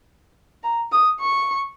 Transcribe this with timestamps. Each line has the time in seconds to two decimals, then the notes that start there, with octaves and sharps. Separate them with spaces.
0.63 A#5
0.92 D#6
1.20 C#6